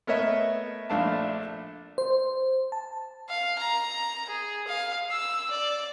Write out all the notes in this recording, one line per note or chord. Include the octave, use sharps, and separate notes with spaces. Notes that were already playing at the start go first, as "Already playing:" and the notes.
A3 B3 A#4 C#5 D#5 E5
A#1 A3 D4 F5 A5
C5
A5
F5
A#5
G#4
F5
E6
D5